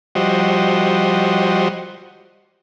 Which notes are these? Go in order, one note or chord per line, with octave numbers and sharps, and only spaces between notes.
F3 G3 F#4 C5 D#5